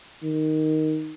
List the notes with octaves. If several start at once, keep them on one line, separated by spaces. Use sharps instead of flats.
D#3